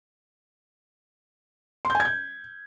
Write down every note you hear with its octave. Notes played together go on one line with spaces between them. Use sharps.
C6
G6
G#5
G#6
G6